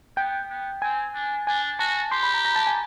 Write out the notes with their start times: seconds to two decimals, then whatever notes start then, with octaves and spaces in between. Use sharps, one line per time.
0.17 B3 G5
0.49 B3
0.82 C4 G#5
1.14 D4
1.47 D4 G#5
1.79 F#4 A5
2.12 G4 C6
2.23 B5
2.34 A#5
2.45 A#5
2.55 A5
2.67 G#5